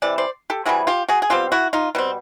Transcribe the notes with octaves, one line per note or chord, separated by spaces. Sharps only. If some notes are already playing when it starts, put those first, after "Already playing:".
C3 E3 D5
C5 D5
G4 A4
C3 E3 G3 F#4 G#4
F4 G4
F#4 G#4
G#4
B2 G3 C4 F4 G4
E4 F#4
D#4 F4
B2 G3 C4